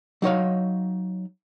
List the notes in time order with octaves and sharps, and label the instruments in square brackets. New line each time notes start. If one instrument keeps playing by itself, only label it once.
[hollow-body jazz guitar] F#3 D#4 C#5 F5